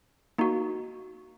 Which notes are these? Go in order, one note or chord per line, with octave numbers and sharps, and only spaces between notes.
A#3 D#4 F#4